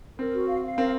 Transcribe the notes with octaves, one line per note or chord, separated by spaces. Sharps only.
C4 A#4
F#4
F5
F5
C4 A#4